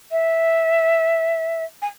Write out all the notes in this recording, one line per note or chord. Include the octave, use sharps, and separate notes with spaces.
E5
G#5